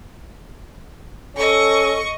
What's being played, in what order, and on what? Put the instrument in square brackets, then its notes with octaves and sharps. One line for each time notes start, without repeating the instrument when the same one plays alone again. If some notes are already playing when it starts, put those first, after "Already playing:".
[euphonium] C#4 [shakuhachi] A4 [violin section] D#5 C#6